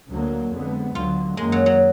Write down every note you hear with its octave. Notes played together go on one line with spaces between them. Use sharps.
D2 D3 F#3 A#3
F2 D3 G#3 B3
D2 D3 F#3 F4
F#2 D#3 G#3 A#3
F#3
F#3